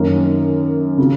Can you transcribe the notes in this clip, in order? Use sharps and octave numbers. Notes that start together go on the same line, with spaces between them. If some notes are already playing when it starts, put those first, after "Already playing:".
Already playing: F#2 D#3 A#3 C#4
C#3 F#3